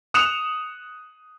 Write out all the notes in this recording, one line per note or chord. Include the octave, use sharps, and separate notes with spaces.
D#6 F#6 C#7 E7 F7